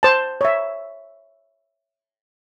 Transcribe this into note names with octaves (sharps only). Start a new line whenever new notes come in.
C5 A5
C#5 E5